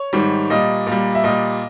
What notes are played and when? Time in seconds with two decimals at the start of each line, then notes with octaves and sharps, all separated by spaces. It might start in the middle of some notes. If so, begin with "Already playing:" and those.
Already playing: C#5
0.13 G#2 D#3 G3
0.50 A#2 G3 D#5
0.87 A#2
0.92 G3
1.15 E5
1.24 A#2 G3 D#5